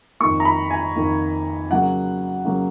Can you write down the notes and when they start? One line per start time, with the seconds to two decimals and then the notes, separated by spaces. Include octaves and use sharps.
0.20 F2 D#3 A#3 C#6
0.40 A#5
0.45 B5
0.70 G#5
0.96 F2 D#3 A#3
1.70 C#3 F#3 A#3 F#5
2.44 C#3 F#3 A#3